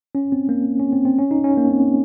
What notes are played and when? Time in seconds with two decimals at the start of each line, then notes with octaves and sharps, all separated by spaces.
0.15 C#4
0.32 C4
0.49 A#3
0.80 C#4
0.93 C4
1.05 C4
1.19 C#4
1.31 D#4
1.44 C#4
1.57 A#3
1.71 C4